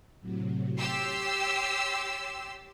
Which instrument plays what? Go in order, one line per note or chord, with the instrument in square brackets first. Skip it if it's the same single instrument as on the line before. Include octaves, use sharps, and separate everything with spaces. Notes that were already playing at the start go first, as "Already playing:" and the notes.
[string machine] A2 C3 F#3
[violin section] G4 C6 E6 [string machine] C#5 D6 A6